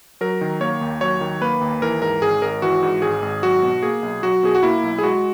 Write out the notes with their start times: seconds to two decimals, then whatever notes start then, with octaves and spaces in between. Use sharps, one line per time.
0.21 F#3 A#4
0.41 D#3
0.61 A#3 C#5
0.81 D#2
1.01 F#3 C#5
1.21 D#3
1.41 A#3 B4
1.61 D#2
1.82 E3 A#4
2.02 G#2 A#4
2.21 G#1 G#4
2.42 G#1 A#4
2.62 E3 F#4
2.83 G#2
3.02 G#1 G#4
3.22 G#1
3.43 F#3 F#4
3.63 B2
3.83 A#3 G#4
4.02 B1
4.23 F#3 F#4
4.43 B2 G#4
4.55 F#4
4.63 A#3 E4
4.83 B1
4.98 G#4
5.03 G#3 F#4